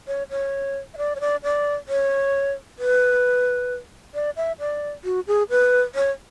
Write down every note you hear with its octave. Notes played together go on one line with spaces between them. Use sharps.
C#5
C#5
E5
D5
C#5
D5
D5
C#5
B4
D5
E5
D5
F#4
G#4
B4
C#5